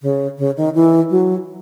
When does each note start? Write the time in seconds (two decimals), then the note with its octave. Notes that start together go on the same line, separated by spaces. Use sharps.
0.02 C#3
0.38 C#3
0.57 D#3
0.75 E3
1.10 F#3